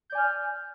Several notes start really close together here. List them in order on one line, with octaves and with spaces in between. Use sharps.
G6 D5 G#5 F6